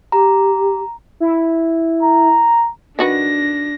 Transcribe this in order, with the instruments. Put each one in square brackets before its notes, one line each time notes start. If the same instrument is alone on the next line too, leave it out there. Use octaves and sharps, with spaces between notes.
[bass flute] G4 [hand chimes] A#5
[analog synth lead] E4
[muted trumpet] A#5
[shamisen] D#3 F#4 B4 [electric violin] D4 A#6